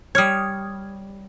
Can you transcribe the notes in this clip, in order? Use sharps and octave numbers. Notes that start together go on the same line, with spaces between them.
G3 C#5 D#6 F6 G#6